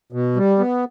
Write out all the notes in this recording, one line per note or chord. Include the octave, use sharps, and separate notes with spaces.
B2
G3
B3